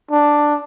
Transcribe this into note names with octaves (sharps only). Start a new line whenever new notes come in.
D4